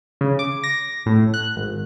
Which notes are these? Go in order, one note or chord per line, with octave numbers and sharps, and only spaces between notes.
C#3
D6
A#6
A2
F#6
G#1